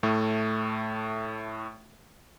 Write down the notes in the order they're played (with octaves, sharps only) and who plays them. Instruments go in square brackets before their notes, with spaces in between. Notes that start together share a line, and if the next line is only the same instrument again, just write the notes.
[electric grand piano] A2 A3